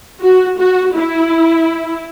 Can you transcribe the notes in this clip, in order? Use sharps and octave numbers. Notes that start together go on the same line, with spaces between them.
F#4
F#4
E4